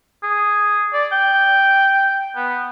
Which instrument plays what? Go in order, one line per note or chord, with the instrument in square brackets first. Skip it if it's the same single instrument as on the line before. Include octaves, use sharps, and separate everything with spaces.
[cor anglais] G#4
D5
G5
B3